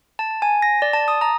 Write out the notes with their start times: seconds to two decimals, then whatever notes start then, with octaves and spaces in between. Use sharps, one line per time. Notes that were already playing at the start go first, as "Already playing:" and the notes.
0.19 A5
0.42 G#5
0.62 A#6
0.82 D5
0.93 A5
1.08 D#6
1.21 A#5